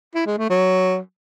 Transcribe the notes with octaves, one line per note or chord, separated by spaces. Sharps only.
E4
G#3
A3
F#3